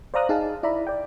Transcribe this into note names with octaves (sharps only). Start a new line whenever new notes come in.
C5 D5 F5 A#5 D#6 F#6
D#4 G#4 F5 A5
E4 D5 E5 A#5 B5
D5 G5